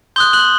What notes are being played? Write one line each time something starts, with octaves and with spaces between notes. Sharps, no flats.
C6 D#6 F#6 G6 G7
F#6 F#7